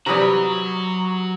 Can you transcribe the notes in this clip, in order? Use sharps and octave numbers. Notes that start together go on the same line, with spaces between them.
C3 E3 F#3 G3 F#4 A#5 D#6